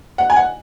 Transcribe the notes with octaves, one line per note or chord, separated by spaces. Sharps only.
F#5
G#5
F#5